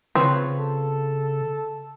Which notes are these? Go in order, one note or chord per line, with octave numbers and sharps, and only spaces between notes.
C#3 C4 F4 B4 C#5
A4